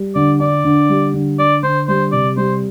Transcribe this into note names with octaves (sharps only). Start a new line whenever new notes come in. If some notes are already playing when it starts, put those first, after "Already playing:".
Already playing: G3
D3 D5
D4 D5
D3
G3
D3
D4 D5
D3 C5
G3 C5
C3 D5
G3 C5